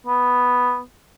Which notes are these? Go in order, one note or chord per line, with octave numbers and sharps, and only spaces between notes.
B3